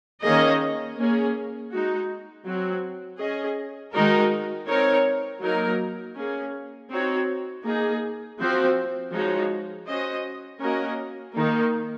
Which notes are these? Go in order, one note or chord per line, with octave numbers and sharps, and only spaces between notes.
D#3 A#3 C#4 G#4 D#5
A#3 C#4 G#4
G#3 D#4 F#4
F#3 C4 F#4
C#4 G#4 D#5
D#3 G#3 D#4 F#4 A#4
C4 D#4 A#4 C#5
F#3 A#3 D#4 A#4
A#3 C#4 G#4
C4 D#4 F#4 C#5
A#3 D#4 G#4
F3 C4 F#4 C5
F3 G#3 D#4 F#4 C#5
C#4 F#4 C5 D#5
A#3 C#4 F#4 A#4 D#5
D#3 A#3 D#4